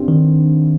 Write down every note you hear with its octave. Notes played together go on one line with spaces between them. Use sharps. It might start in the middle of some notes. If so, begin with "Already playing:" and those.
Already playing: G2 D3 G3 C4
D#3